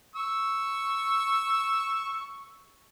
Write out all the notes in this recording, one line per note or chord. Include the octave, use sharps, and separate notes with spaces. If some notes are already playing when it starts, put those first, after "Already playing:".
C#6 E6